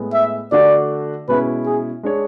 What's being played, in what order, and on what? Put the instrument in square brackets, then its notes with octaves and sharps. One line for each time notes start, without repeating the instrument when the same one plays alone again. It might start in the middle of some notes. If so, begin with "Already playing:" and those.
Already playing: [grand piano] A2 G#3 B3
[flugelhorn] E5
[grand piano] D3 A3 D4 F#4 [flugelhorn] D5
[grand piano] B2 G#3 C#4 E4 [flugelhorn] B4
[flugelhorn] G#4
[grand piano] G#3 D4 G#4 C#5